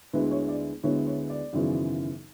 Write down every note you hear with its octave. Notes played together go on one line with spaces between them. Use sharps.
D2 D3 G#3 B3 E4 B4
C#5
D5
D2 D3 G#3 B3 E4 C#5
C#5
D5
G#1 F#2 C#3 E3 B3